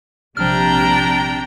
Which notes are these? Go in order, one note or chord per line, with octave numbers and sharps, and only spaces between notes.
A#1 C3 F3 G3 D4 G5 A#5 F6